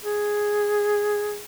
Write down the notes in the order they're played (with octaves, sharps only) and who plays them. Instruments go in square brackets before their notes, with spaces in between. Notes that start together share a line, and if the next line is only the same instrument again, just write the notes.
[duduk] G#4